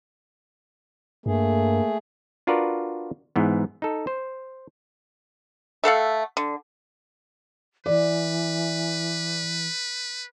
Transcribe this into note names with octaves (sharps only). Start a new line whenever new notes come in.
G2 A3 A#3 G#4
D4 F4 F#4 A#4 B4 D5
G#2 E3 B3
D#4 A4
C5
A3 A4 F5 F#5
D3
E3 B4 D5